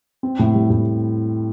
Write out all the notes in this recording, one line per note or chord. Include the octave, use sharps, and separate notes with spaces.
C4
A2
G3
A2